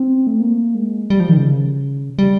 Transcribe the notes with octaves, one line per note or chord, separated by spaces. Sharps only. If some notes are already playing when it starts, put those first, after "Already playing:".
Already playing: C4
A3
A#3
G#3
G3
F3
D#3
C#3
G3